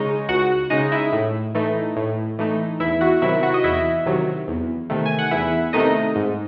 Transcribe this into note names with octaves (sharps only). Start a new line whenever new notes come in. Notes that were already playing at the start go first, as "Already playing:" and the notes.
Already playing: C#3 G#3 C#4 D#4 C#5 D#5
C#2 F#4 F#5
C#3 G#3 D#4 D#5
E4 E5
A2
E3 A3 D#4
A2
E3 A3 D#4
E2 E4 E5
F#4 F#5
C3 D#3 F#3 E4 E5
F#4 F#5
D#5
E2 E4 E5
C3 D#3 F#3
E2
C3 D#3 A3
G#5
F#5
E2 E4 E5
C3 D#3 A3 D#4 D#5
G#2